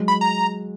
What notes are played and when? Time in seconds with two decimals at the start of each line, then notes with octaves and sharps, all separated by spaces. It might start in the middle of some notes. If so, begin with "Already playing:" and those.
Already playing: F#3 G#3
0.08 B5
0.21 A#5